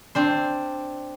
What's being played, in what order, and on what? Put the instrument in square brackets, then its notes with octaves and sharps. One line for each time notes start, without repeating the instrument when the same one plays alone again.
[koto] C4 D4 C5